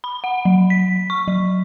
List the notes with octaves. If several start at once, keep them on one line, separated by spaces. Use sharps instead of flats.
B5
F#5
F#3
B6
C#6
F#3